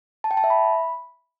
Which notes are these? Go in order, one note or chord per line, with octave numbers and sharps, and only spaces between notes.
A5
G5
A5
E5
B5